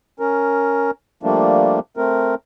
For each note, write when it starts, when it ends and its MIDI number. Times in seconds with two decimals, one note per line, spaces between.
0.20 0.91 61
0.20 0.91 70
1.23 1.80 53
1.23 1.80 55
1.23 1.80 57
1.23 1.80 58
1.23 1.80 62
1.97 2.35 57
1.97 2.35 60
1.97 2.35 70